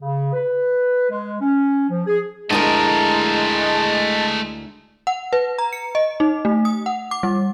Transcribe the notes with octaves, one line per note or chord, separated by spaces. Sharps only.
C#3
B4
G#3
C#4
F3
G#4
D2 G#3 A3 E4 A#4 D#5 A5
F#5
B4
A#5
C#7
D#5
D#4
A3
D#6
F#5
D6
G3